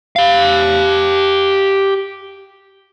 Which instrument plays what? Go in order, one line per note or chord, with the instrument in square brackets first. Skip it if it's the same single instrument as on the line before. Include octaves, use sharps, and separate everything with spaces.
[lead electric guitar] G4 F5